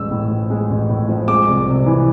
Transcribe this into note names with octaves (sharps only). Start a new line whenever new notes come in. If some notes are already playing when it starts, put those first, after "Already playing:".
Already playing: A1 G#3 E6
A2
F3
G#3
A1
A2
F3
G#3 D6
C2
C3
E3